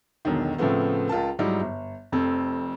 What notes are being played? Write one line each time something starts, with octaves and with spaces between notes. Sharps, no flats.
E1 B1 D3 D#3
A2 C#3 F3 A3 B3 C4
C#2 F4 A#4 A5
G#2 F#3 G3 D#4 E4
G1
F1 F2 C4 A4